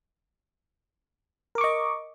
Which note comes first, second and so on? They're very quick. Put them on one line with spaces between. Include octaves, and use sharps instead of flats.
A#4 D6 C#6 D#5